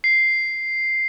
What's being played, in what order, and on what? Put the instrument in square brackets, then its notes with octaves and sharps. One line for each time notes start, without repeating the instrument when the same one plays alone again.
[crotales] C7